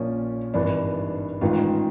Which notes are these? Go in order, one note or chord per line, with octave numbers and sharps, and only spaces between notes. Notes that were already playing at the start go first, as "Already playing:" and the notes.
Already playing: A#1 A#2 F3 C#4
G#1 G2 E3 D4
A1 G#2 D#3 F4